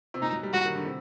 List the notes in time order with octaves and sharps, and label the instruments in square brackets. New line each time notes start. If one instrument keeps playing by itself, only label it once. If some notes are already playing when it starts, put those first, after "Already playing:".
[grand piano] C3
[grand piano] A#2 [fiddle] D#4
[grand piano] F#3
G3
[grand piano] F#3 [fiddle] F#4
[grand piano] D#3
D3
C3